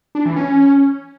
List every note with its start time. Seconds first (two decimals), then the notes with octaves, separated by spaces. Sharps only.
0.15 D4
0.26 E3
0.36 C#4